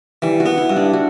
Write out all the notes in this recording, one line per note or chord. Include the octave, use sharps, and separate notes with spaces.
E3 G3
F#4
B3
E4
G2
D4
F#4